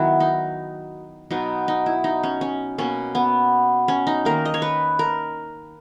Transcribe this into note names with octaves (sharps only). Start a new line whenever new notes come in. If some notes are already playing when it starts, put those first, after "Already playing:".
Already playing: D#3 F#3 B3 E4 F#4
D#4
B2 F#3 B3 D#4
D#4
E4
D#4
C#4
C#4
B2 A#3 C#4
B3
C#4
D#4
D#3 A#3 A#4
D#5
C#5
B4
A#4